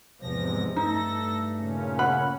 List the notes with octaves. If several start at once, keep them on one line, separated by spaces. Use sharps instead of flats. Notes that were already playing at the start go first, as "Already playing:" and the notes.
E2 G#2 C3 F3 A#6
G2 A3 D#4 A4 A#6
A#2 C#3 C#4
F#5 B5